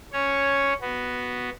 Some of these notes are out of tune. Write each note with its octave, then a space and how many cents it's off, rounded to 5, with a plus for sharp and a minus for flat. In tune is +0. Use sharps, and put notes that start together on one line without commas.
C#4 +0 C#5 +0
B3 +0 F#4 +0